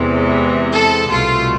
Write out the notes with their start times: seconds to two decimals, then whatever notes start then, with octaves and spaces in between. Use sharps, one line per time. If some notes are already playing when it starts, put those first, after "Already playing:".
Already playing: E2 C3 E3 G#3
0.72 A4
1.10 C2 B2 A3 F4